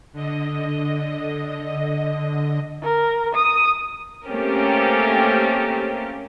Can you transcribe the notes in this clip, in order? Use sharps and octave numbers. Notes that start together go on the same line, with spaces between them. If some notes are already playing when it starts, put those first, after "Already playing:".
D3 D#5
A#4
D#6
A3 A#3 C4 C#4 G4 A#4